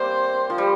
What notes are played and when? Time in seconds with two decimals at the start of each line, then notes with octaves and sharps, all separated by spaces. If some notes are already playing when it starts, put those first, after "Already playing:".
Already playing: G3 A#3 C4 C5
0.50 F3
0.58 G3